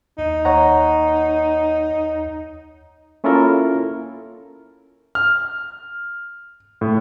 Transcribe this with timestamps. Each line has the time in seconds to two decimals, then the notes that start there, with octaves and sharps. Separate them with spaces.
0.18 D#2 D#4
0.45 D#2 C#5 F#5 A#5
3.24 A#3 C#4 E4 F4 A4 A#4
5.15 F6
6.81 A2